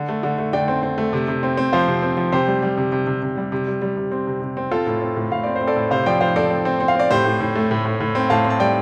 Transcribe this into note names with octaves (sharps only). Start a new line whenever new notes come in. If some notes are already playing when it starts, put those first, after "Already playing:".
Already playing: D3
A3
D3
A3
D3 D5 G5
C4
C4
A3
C3
C3
C4
C4
F3 C5 F5
C3
C4
F3
C3 G4 C5
G3
G3
C3
C3
C3
C3
G3
C3
G3
G3
C3
C4
C3
C3
C4
C4 F4 A4
A2
C4
A2
A2 F5
C4 D5
C5
C4
A4 D5
A2
C3 C5 F5
F3 D5 G5
F3 C5 F5
C4 A4 D5
C4
C4
C4
F5
C4 D5
A2 G4 C5
A2
A2
A3
A2
A2
A2
C4
A2 F5 A5
C4
A5
G3 D5 G5